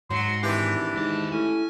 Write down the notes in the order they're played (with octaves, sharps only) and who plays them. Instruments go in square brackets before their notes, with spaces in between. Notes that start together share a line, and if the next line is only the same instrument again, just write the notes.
[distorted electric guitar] G#2 [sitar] F#3 [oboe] C6
[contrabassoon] G#1 [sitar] E3 G4 [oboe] D4
[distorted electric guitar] D#2 A5 [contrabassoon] G#2
[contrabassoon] A2 [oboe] C#4 [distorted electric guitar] G#5